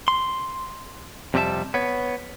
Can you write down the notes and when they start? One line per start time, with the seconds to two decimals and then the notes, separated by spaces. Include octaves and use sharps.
0.08 C6
1.34 F2 C3 G3 C#4 E5 A5
1.74 B3 C#5